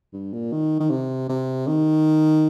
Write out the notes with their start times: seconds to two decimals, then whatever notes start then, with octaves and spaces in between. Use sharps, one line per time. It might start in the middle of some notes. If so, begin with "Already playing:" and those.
0.13 G2
0.33 A#2
0.52 D#3
0.80 D#3
0.90 C3
1.29 C3
1.68 D#3